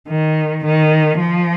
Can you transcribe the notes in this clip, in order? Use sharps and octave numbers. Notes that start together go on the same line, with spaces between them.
D#3
D#3
F3